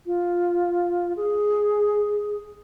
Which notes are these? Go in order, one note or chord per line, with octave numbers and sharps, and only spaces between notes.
F4
G#4